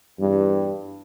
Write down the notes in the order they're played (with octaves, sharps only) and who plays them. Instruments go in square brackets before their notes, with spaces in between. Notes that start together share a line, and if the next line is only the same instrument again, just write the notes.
[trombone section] E2 G2